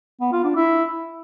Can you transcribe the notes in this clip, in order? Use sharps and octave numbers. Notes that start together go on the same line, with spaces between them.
B3
F4
D4
E4